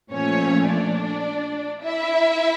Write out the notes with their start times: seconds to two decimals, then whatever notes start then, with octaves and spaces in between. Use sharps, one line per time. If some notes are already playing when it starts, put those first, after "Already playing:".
0.12 A#2 F3 A3 C#4 C#5
0.69 D4 D5
1.83 E4 E5